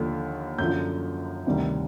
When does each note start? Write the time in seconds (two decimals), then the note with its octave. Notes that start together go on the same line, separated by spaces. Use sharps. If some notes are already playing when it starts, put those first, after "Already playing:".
Already playing: D#2 D3 F3
0.59 F#2 D3 F3 G6
1.46 D2 C3 D#3 G3